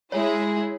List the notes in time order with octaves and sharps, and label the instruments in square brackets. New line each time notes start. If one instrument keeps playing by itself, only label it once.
[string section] G#3 E4 G#4 [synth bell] C#5